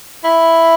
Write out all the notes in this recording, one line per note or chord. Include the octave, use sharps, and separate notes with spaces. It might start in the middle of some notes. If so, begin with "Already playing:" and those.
E4